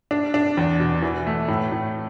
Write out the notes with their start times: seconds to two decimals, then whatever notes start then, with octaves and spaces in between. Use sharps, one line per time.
0.11 D4
0.34 D4
0.57 E2
0.80 B2
1.02 E3
1.27 A3
1.48 A2
1.72 A2